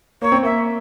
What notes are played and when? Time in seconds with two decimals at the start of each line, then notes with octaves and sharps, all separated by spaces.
0.21 A#3 C#5
0.32 C4
0.43 A#3 E5